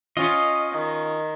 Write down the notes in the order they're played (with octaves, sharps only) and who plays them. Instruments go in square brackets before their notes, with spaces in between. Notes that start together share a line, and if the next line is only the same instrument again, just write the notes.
[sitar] C#4 F4 [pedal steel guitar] D#5
[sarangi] D#3